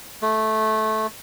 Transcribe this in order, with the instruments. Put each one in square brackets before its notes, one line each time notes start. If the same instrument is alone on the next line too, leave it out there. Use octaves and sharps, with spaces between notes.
[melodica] A3